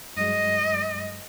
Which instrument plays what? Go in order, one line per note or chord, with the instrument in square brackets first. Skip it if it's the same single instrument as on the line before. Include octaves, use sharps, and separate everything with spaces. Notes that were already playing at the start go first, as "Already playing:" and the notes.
[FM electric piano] G2 F#3 G#3 [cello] D#5